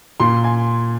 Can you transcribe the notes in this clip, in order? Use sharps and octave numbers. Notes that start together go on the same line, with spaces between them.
A#2 C6
G#5